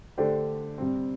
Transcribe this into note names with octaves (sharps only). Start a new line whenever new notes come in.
D3 A3 D4 G4 C5
C3 G3 C4